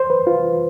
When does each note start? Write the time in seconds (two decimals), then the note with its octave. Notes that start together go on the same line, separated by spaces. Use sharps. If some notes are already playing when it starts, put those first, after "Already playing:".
Already playing: C5
0.10 B4
0.27 F4